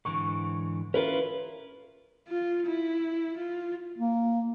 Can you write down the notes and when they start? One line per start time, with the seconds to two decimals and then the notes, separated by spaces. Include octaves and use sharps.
0.05 G#2 D3 E3 C#6
0.94 C#4 E4 F4 A#4 B4
2.28 F4
2.66 E4
3.37 F4
3.97 A#3